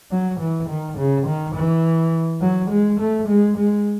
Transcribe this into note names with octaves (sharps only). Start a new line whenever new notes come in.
F#3
E3
D#3
C#3
D#3
E3
F#3
G#3
A3
G#3
G#3